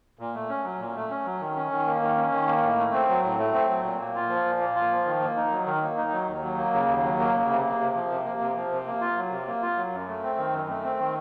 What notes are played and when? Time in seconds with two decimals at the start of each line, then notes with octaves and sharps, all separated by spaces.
0.19 A#2
0.35 A3
0.49 C#4
0.64 F#3
0.80 A#2
0.95 A3
1.10 C#4
1.25 F#3
1.41 D#3
1.56 C#4
1.71 D#3
1.87 A#3
2.01 D#3
2.17 C#4
2.32 D#3
2.47 A#3
2.63 A2
2.78 A3
2.94 C4
3.09 F#3
3.24 A2
3.39 A3
3.54 C4
3.69 F#3
3.84 A#2
4.00 A#3
4.15 F4
4.29 F3
4.45 A#2
4.60 A#3
4.75 F4
4.91 F3
5.05 D#3
5.21 A#3
5.37 D#4
5.51 F#3
5.66 D#3
5.82 A#3
5.97 D#4
6.12 F#3
6.27 D#2
6.42 F#3
6.57 A#3
6.73 C#3
6.88 D#2
7.03 F#3
7.19 A#3
7.34 C#3
7.49 C3
7.65 A#3
7.80 C3
7.95 F3
8.10 C3
8.25 A#3
8.41 C3
8.56 F3
8.71 C3
8.87 A#3
9.01 F4
9.17 F#3
9.31 C3
9.47 A#3
9.62 F4
9.77 F#3
9.93 F#2
10.08 A3
10.23 C4
10.38 D#3
10.53 F#2
10.69 A3
10.84 C4
10.99 D#3